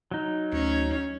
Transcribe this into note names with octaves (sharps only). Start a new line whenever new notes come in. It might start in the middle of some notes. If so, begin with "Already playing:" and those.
F#3 D#4
D2 C#4